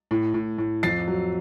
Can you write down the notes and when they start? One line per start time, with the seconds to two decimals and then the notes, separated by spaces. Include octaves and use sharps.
0.11 A2
0.34 A2
0.58 A2
0.83 F2 A6 C7
1.08 F#3